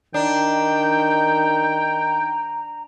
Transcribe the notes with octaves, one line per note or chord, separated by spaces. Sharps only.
D#3 D4 G5 A#5